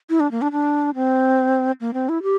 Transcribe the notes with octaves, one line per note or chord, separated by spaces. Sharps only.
E4
D4
A#3
D4
D4
C4
A#3
C4
E4
G4